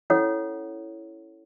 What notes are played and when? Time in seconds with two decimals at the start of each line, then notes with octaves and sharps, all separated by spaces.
0.10 C#4 E4 A4 C#5 F#5